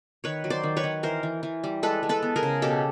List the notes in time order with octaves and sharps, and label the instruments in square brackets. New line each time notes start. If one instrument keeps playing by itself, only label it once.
[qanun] D#3 B4 C#5
F#3
C5 D5
D#3
B4 C#5
D#3
E3 A#4 C5
E3
E3
G3
G#3 A4 B4
G#3
A4 B4
B3
G#4 A#4
C#3
B2 G4 A4